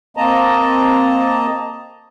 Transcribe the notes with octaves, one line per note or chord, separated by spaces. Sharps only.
A#3 C4 D#5 A5 A#5